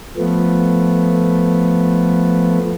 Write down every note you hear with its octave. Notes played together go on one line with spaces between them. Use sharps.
F3 A3 B3